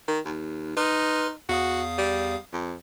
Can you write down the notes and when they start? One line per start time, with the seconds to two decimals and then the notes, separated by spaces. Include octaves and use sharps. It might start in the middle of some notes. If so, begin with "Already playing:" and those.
0.08 D#3
0.25 D#2
0.77 D#4 B4 C6 F6
1.49 E2 F#4 F5 D#6
1.98 G3
2.53 F2